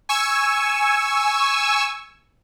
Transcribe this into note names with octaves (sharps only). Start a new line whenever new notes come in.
G#5 C#6 E6